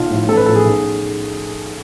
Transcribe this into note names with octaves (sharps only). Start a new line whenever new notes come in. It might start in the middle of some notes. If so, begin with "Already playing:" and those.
Already playing: B1 F4
A2 F3
A1 A4
B4
A2 F3 A4
G#4
B1